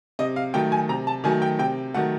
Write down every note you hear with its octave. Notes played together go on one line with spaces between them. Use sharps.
C3 D#5
F5
D#3 F#3 A3 G5
G#5
C3 A#5
A5
D#3 F#3 A3 G#5
G5
C3 G5
D#3 F#3 A3 F#5